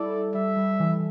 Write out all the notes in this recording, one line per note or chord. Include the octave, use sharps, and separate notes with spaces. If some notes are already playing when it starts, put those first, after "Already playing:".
Already playing: G3 E4 A4 D5
A4
G3 E5
G3
E3